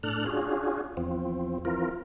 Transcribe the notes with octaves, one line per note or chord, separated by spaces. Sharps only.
A2 D4 A4 F6 F#6
C#4 D4 F4 F#4 G#4
E2 F3 C4
E3 F3 C4 F4 A#4